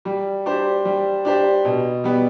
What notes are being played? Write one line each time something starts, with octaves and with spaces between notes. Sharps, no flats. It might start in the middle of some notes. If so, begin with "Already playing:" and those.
G3
D4 G4 C5
G3
D4 G4 C5
B2
G3 B3